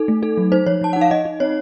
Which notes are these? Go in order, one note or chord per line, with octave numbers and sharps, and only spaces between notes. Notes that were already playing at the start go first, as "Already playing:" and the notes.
Already playing: D#4 A4
A3
D#4 A4
F#3
D#4 C5
F3 C#5
F3 A5
D#4 F#5
F5
D#4 D#5
D#4
C4 C#5